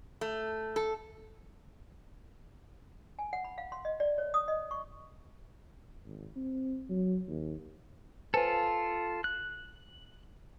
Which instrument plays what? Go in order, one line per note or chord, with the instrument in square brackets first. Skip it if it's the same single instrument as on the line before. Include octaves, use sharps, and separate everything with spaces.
[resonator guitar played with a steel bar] A3
A4
[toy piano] G#5
F#5
B5
F5
C6
D#5
D5
C#5
D#6
D#5
C#6
[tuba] G#1
C4
F#3
D#2
[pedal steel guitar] F4 A4 [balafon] B4 C5 G#5
[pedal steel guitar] F#6